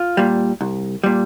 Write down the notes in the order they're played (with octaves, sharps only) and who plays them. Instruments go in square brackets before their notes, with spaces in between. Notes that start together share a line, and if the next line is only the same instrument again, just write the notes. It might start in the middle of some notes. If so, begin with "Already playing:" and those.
Already playing: [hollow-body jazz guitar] F4
A#2 G3
C2
A#2 G3